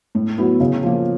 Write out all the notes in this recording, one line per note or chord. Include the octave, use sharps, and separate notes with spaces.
A2
F#3 B3 E4
C#3
F3 A#3